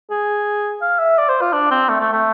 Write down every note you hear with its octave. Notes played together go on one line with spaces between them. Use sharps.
G#4
F5
E5
D5
C5
F4
D4
C4
A3
A3
A3